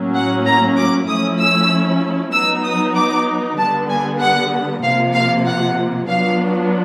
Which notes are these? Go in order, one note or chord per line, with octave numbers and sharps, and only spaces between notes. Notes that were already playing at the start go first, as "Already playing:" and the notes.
Already playing: A2 F#3 A#3 C#4
F#5
A#5
D6
F3 A3 C#4 E4 D#6
E6
F#3 B3 D#4 E6
D#6
D6
D3 G3 B3 A5
G#5
F#5
C3 F3 A#3 F5
F5
F#5
F#3 B3 D4 F4 F5